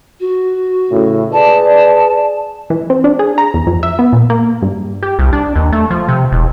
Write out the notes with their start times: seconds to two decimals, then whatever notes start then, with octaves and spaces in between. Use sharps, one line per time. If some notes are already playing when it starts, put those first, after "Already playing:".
0.20 F#4
0.91 A2 C#3
1.33 G#4 B4 D5 A5
2.70 E3
2.90 C4
3.04 D4
3.19 G#4
3.38 A#5
3.54 E2
3.67 F2
3.83 E5
3.99 B3
4.13 A#2
4.30 A#3
4.62 G2
5.03 G4
5.19 C2
5.33 D4
5.56 D#2
5.72 A3
5.90 F3
6.08 C3
6.32 E1